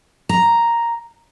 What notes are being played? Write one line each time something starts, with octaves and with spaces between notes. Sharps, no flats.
A#5